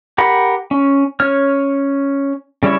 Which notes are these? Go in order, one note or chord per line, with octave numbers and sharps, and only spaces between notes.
G4 A#4 F#5 B5
C#4
C#4 C#5 F6
C#3 G3 C#4 E4 C#5